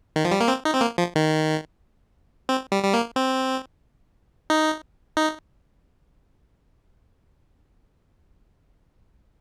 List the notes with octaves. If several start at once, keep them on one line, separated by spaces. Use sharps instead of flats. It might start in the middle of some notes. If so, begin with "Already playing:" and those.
D#3
F3
G3
A#3
C4
D#4
C4
A#3
F3
D#3
C4
G3
G3
A#3
C4
D#4
D#4